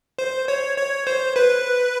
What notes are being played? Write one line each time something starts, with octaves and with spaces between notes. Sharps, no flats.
C5
C#5
C#5
C5
B4